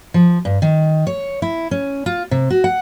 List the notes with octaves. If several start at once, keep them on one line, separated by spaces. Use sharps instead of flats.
F3
G2
D#3
C#5
E4
C#4
F4
C3
F#4
F#5